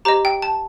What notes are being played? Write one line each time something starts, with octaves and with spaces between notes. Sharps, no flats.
G4 C5 D#5 A#5
G5
A5